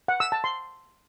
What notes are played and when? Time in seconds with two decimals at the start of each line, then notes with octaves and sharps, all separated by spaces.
0.08 F#5
0.20 E6
0.32 A5
0.44 C6